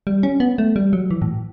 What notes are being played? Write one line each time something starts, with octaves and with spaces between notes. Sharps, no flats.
G3
C#4
B3
A3
G3
F#3
E3
A2